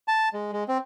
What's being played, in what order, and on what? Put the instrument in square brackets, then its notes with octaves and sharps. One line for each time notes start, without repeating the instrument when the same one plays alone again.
[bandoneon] A5
G#3
G#3
C4